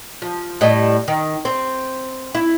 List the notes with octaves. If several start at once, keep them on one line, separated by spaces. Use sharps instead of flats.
F3
A2 G3 D#5
D#3
C4
E4